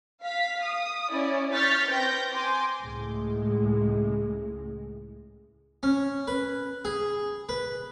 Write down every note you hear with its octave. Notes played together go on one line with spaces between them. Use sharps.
F5 B6
D#6
C#4 E4 D5
C#6 F6 G6 A6 B6
C4 B4 G5 G6 A#6
G#5 C6 D6
C#2 A2 G#3
C#4
B4
G#4
B4